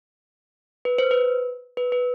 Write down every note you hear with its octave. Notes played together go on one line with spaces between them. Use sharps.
B4
C5
B4
B4
B4